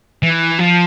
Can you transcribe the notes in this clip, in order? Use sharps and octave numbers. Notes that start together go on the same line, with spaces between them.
E3
F3